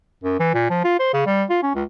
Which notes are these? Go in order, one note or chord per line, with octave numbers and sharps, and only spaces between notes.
F#2
E3
A#2
F3
F4
C5
C#3
G3
F4
C#4
C#2